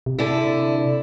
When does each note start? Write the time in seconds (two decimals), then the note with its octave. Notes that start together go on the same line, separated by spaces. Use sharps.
0.06 C3
0.19 D3 E4